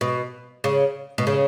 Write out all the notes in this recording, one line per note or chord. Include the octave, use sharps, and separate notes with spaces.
B2
C#3
B2
C#3